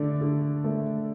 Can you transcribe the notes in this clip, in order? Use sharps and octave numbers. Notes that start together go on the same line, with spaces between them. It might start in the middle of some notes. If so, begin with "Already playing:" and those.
Already playing: D3 A3 D5
D3
A3